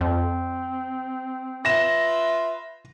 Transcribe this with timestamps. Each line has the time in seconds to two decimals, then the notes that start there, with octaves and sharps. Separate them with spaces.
0.01 F2 C4
1.65 F4 B4 E5 A#6 E7